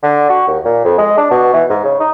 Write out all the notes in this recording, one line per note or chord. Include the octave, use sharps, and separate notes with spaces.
D3
F#4
D#2
A#2
F2
G#3
D4
B2
E3
G#2
C#3
D#4